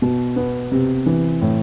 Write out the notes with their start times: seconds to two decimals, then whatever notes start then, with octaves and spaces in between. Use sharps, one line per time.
0.02 B2
0.36 B3
0.72 C3
1.06 E3
1.41 A2